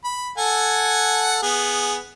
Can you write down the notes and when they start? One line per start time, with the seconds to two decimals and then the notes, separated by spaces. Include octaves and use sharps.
0.04 B5
0.38 A4 F#5 G#5
1.43 B3 G#4